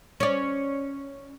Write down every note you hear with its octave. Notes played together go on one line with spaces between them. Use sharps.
C#4 D5